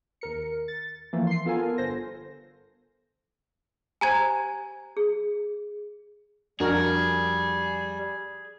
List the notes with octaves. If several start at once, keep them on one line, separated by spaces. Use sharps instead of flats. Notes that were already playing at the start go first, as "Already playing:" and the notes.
D#2 A#4 C#7
A6
E3 F3 A3 A#3
C6 C7
B3 F4 A4 A#4 G#5
G1 A4 C5 A#6
G4 C5 G#5 A#5 G#6
G#4
F2 G3 D4 F#4 G#4 A#4